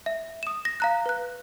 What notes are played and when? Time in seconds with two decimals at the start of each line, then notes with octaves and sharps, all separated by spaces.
0.06 E5
0.43 D#6 E7
0.65 A#6
0.80 F5 A#5 F#6
1.06 B4 F#6